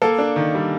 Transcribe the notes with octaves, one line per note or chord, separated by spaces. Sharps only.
A#3 A4
D4
D#3
G3